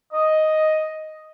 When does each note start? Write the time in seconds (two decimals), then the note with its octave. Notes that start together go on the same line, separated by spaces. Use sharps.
0.13 D#5